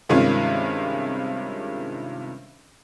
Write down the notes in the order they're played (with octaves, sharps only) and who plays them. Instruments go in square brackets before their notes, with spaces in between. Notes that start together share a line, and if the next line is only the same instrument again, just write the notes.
[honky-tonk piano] G2 C3 D#3 G#3 C#4 F4